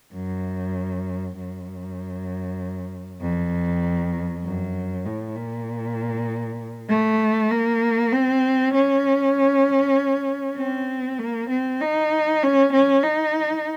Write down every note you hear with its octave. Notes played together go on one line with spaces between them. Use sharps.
F#2
F#2
F2
F#2
A2
A#2
A3
A#3
C4
C#4
C4
A#3
C4
D#4
C#4
C#4
D#4